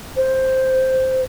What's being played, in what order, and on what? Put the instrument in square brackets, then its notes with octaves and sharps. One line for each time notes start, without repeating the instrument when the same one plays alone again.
[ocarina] C5